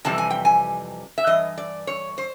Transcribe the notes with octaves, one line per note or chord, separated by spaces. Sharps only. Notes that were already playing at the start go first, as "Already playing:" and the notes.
F2 C3 E3 G3 A5
G#5
G5
G#5
E5
G2 E3 D#5
D5
C#5
C5